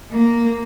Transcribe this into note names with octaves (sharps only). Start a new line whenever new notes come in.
A#3